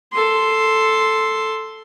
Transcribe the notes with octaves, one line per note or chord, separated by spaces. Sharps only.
A4 C6